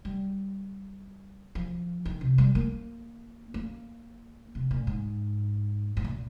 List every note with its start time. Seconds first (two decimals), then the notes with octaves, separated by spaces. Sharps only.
0.05 G3
1.55 F3
2.05 D#3
2.21 C3
2.38 G3
2.55 A#3
3.54 A#3
4.55 C3
4.71 A#2
4.87 G#2
5.97 G#2
6.04 A#2